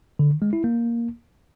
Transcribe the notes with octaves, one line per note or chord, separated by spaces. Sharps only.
D3
D#3
G#3
E4
A#3